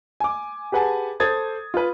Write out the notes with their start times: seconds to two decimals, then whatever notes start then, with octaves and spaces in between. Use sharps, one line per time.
0.20 G#5 D6
0.72 G4 G#4 B4 F#5 G#5 A5
1.20 A4 C5 D#6 G#6 A6
1.74 F4 B4